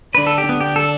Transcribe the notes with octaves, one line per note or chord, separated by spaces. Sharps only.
D3 D4 B4
A4
G4
B3
D3 D4 G4
A4